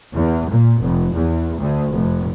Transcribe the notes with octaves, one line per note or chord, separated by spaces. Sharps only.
E2
A#2
F1
E2
D2
F1